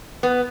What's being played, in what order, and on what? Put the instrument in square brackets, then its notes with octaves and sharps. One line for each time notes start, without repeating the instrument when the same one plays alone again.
[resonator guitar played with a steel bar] B3